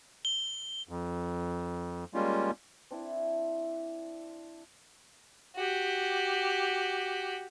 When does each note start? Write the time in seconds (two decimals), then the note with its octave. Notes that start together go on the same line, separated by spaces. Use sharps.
0.25 G7
0.89 F2
2.14 G3 G#3 A#3 C#4 F4
2.91 C4 D4 E4 E5
5.56 F#4 G4